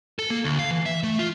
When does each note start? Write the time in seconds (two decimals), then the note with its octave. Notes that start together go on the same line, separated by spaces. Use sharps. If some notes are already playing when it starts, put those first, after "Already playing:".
0.19 A4
0.30 A#3
0.44 D2
0.59 F5
0.71 E3
0.86 E5
1.03 A3
1.19 F4